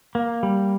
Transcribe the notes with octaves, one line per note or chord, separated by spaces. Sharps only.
A#3
G3